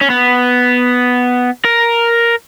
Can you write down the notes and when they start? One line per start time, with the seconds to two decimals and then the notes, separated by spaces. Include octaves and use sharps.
0.01 C#4
0.10 B3
1.65 A#4